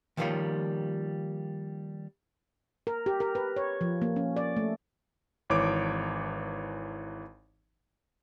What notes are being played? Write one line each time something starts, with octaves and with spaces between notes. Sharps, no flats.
D#3 F3 G3 A#3 F4 C#5
A#4
G4
A#4
B4
C#5
F3
A#3
C#4
D5
A3
G#1 E3 C#5 D6 D7